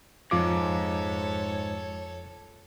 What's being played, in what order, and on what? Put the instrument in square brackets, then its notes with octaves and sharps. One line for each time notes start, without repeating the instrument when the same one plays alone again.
[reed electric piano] F2 F4 D6 [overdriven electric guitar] G#2 [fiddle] A4 C#5